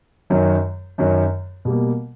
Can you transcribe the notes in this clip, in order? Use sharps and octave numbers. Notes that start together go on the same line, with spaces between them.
F#2 D#3 F#3
F#2 D#3 F#3
B2 G3 A#3